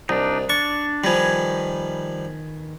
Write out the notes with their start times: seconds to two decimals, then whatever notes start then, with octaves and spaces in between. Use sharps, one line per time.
0.09 C2 D4 D#4
0.49 D4 D5 C#6
1.04 D#3 F3 G3 B4 G#5